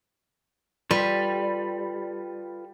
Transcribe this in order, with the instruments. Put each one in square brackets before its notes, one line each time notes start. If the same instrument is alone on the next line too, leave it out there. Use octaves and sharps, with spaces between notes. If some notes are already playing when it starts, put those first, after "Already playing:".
[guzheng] G3 [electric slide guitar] F4 A4 B4